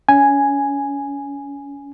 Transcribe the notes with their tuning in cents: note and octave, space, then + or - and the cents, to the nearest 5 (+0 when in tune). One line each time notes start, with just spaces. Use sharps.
C#4 +30 G#5 +0